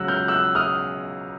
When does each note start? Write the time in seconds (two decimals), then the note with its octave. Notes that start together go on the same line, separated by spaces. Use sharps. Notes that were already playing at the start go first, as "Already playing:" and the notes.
Already playing: C#2 C#3 F#3 E6 F#6
0.08 F6 G6
0.28 E6 F#6
0.55 D#6 F6